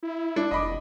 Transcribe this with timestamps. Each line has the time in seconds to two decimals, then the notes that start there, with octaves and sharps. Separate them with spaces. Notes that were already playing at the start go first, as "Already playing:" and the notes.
0.03 E4
0.36 D4
0.51 F1 D#5 B5 D6